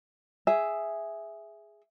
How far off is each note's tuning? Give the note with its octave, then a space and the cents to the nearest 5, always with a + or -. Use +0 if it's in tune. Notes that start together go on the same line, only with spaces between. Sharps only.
G#4 +0 E5 +0